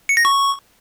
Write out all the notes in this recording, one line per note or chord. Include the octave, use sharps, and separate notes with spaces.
C#7
A#6
C#6